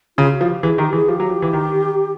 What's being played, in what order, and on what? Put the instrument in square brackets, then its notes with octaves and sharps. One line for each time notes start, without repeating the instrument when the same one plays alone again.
[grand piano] C#3 [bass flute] F4
[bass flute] F#4
[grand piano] F3
[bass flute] G4
[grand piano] E3 [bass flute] G#4
[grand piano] D#3 [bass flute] G4
[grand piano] E3 [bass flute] G#4
[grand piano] F3 [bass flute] G4
[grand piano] F#3
F3
E3
D#3